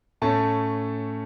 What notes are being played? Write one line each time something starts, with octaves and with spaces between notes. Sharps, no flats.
A2 A3 C#4 A5